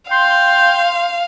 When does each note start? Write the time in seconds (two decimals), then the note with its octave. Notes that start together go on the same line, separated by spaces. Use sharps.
0.11 F5 G5 C6